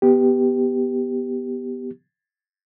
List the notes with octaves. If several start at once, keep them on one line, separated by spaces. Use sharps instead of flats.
B3 G4